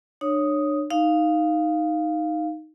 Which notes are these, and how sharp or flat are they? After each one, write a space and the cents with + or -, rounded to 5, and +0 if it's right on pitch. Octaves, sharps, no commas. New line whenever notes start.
D4 +35 C#5 +0 D#6 +0
D#4 +0 F5 +0